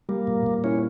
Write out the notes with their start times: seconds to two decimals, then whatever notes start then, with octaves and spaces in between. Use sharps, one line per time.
0.09 G3 A#3
0.27 A#2
0.46 A#2
0.64 C#4 E4